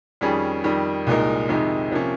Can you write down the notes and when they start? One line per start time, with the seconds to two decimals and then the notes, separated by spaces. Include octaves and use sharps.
0.21 F2 D#3 G3 C#4 G#4
0.64 F2 D#3 G3
1.07 C2 A#2 G#3 D#4 A#4
1.49 F2 C3 D#3 G#3 D#4
1.91 C3 F3 A#3 C#4